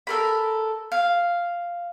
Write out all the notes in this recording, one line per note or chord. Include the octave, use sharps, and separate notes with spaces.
A4 A#4 B5
F5